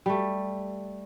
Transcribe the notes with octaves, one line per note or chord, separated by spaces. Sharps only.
G3 A3